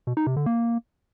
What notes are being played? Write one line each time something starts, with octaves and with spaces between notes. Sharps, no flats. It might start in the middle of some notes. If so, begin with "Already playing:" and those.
B2
D#4
C3
D3
A#3